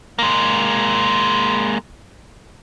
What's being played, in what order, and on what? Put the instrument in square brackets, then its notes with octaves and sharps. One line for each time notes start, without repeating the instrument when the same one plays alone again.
[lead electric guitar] G#3 A#3